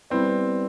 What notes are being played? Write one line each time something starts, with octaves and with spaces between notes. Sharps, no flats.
G3 B3 C4 E4 B4 D5